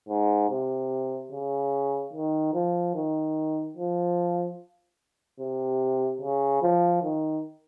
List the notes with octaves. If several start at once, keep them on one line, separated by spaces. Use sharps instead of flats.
G#2
C3
C#3
D#3
F3
D#3
F3
C3
C#3
F3
D#3